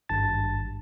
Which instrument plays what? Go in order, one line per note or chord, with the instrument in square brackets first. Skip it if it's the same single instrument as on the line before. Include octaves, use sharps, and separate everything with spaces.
[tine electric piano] G#1 G2 A5 A6